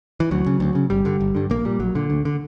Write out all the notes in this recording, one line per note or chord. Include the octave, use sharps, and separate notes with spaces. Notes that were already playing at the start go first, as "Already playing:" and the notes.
E3
D2 F#3
C#3
D2
C#3
G1 G3
G2 D3
G1
G2 D3
A#1 A#3
A#2 G3
A#1 F#3
A#2 D3
D2
D3